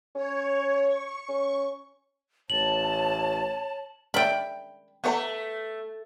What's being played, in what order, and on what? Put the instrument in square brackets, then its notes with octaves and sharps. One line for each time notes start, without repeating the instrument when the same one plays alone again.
[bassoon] C#4 [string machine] C#5
[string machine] C#6
[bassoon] C#4
[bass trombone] A1 [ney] C#5 [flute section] A5 [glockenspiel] F#7
[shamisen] A#4 D5 E5 [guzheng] G5 B5
[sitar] A3 [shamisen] B3 C#5 A#5